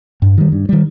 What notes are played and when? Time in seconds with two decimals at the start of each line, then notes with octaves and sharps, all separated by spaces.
0.22 G2
0.38 D#3 G3
0.52 G2
0.69 D#3 G3